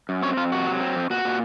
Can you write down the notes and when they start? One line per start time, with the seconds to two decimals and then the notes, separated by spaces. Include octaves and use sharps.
0.09 F#2
0.22 C4 C#5
0.37 F2 F4
0.52 C3 F#4
0.67 F#3
0.80 C4
0.96 F2
1.10 A#2 F#4
1.25 A#2